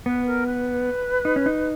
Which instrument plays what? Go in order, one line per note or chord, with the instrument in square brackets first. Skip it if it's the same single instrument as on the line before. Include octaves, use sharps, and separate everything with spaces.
[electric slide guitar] B3 [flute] B4
[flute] A#4
B4
[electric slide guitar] D#4
C#4
D#4